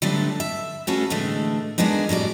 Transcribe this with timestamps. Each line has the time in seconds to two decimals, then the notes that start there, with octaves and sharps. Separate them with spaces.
0.02 D3 F#3 G3 A3 B3 D4
0.40 E5
0.87 A3 C#4 F#4 G#4 A4 B4
1.10 A2 D3 E3 G#3 A3
1.78 G#3 A#3 B3 D4 D#4
2.09 A2 G3 F#4 D5